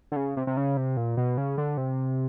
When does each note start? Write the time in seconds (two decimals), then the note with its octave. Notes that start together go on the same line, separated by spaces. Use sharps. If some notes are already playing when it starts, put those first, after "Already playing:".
0.12 D3
0.16 C#3
0.37 C3
0.47 C3
0.57 C#3
0.77 C3
0.97 A#2
1.17 B2
1.38 C#3
1.58 D3
1.77 C3